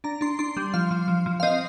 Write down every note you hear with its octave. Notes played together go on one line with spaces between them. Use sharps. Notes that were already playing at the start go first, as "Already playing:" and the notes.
D4 A#5
D4 C6
D4 C6
G3
F3 F5
F3
F3
F3
F5
C4 D#5